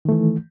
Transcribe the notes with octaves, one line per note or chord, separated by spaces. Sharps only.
D#3 E3 A3